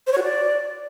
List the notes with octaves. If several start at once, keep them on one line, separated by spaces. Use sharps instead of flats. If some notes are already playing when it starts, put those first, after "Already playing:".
C5
C#5
F#4
D5